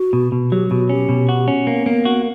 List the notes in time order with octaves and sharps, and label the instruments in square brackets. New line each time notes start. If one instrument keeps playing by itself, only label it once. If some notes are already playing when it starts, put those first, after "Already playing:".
Already playing: [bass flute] F#4
[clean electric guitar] B2
B2
[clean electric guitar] F#3 [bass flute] G4
[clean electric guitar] B2 [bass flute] F#4
[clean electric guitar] C#4 [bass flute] G4
[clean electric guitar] B2
F#4
C#4
[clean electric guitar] A#3 [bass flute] B3
[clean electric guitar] A#3
F#4